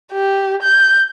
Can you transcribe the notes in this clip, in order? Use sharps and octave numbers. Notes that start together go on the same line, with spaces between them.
G4
G6